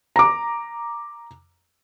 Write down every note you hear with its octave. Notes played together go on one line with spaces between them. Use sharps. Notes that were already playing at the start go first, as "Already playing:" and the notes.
A#5 D6